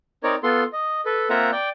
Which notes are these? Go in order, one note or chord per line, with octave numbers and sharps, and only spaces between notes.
C4 D#4 A#4 C#5 D5
B3 F4 A4 C6
D#5
A4 B4
A#3 C4 F4 E5 F#5 A#5
D5 G5